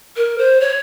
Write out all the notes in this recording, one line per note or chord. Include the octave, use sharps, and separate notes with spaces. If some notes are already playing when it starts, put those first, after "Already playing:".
A#4
C5
C#5